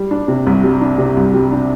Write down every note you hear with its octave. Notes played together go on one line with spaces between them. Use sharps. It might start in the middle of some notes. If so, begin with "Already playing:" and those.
Already playing: G3
D4
C3
C2
G3
D4
C3
C2
G3
D4